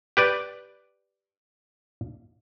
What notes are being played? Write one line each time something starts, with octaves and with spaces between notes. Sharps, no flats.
G4 B4 D5